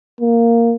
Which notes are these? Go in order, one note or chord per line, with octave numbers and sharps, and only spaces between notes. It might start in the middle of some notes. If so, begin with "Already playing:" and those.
A#3